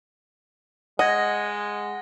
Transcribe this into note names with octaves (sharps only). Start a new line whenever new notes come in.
G#3 D#5 F#5 G#6 A#6 G7